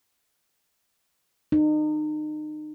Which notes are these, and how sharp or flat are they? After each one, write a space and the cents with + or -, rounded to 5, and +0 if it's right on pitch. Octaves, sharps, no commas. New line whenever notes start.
D#4 -35